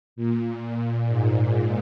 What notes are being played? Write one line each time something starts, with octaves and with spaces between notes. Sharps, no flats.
A#2
A#2
G#2